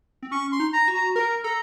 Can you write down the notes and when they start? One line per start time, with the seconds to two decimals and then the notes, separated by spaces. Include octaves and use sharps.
0.22 C4
0.32 C#4 C#6
0.52 C6
0.60 D#4
0.73 A#5
0.88 F#4
0.95 A#5
1.16 A#4 A#5
1.44 A4 A#5